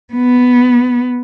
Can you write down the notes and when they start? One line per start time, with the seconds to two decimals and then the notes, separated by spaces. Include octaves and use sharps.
0.14 B3